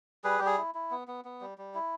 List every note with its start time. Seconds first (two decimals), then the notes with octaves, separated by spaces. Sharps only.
0.24 G3 G#4 B4
0.39 G3 G4
0.46 G#4
0.58 E4
0.75 E4
0.91 B3
1.08 B3
1.25 B3
1.41 G3
1.58 G3
1.74 E4